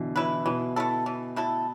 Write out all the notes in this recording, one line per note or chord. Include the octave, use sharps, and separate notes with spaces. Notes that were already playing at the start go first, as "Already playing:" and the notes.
Already playing: B2 D3 E3
E3 E4 B4
B2 E3
A3 E4 A4
E3
A3 E4 A4